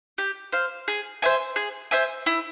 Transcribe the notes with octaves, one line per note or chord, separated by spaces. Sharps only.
G4
C5 F5
G#4
C5 E5 G#5
G#4
C5 E5 G#5
E4